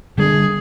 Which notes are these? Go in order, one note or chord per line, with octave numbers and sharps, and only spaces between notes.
D3 G3 A#3 D4 G#4